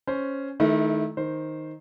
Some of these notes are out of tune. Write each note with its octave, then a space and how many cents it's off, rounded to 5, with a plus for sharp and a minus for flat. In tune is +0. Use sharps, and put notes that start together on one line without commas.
C#4 +0 C5 +0
D#3 +0 A3 -35 E4 -5
D#3 +0 C5 +0